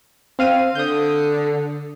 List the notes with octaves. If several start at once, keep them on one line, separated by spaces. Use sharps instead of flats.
C4 F5 D#7
D3 D#6 G6